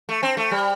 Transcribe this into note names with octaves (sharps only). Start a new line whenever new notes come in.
A3
C4
A3
G3